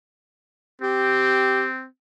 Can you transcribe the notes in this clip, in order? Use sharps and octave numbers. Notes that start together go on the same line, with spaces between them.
C4 G4